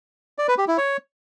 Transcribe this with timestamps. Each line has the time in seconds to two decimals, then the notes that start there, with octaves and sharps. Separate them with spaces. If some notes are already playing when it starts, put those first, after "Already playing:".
0.38 D5
0.48 B4
0.58 G4
0.68 E4
0.78 C#5